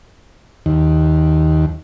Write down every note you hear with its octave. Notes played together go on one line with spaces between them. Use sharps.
D#2